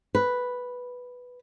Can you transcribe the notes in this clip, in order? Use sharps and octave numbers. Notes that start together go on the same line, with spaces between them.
B4